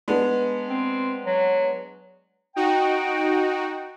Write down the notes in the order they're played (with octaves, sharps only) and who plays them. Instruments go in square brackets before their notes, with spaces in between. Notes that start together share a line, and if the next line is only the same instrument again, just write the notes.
[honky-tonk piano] G#3 B3 D4
[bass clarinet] C4
F#3
[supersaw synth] D#4 F#4 [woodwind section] G5